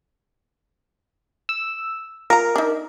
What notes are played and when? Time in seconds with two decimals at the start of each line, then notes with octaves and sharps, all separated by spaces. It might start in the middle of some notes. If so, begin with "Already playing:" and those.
1.49 E6
2.30 F4 A#4 A#5
2.56 D4 D#4